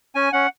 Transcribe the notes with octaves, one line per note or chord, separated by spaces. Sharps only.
C#4 G#5
C#4 F#5